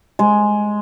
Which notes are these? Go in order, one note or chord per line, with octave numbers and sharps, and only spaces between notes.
G#3